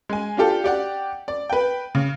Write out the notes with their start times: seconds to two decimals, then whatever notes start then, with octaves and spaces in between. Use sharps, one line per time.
0.09 G#3 G#5
0.37 D4 F4 G4 A4
0.64 G4 D5 F#5
1.28 D5
1.50 B4 G5
1.95 C#3